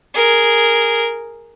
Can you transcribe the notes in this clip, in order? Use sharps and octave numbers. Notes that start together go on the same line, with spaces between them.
G#4 A#4